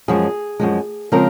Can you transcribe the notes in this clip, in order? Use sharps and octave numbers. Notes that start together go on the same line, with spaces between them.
F#2 F3 G#3 G#4
F#2 F3 G#3
C#3 F3 G#3 C4 A#4